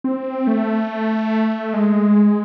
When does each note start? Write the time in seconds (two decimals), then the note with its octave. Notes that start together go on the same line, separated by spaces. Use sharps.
0.04 C4
0.47 A3
1.73 G#3